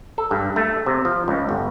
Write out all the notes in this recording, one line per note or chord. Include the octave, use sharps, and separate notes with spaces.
A4
G2
A3
C3
F3
C#2
G1